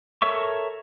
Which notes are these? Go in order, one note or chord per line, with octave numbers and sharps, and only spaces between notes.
A4 A#4 C#5 E5 C#6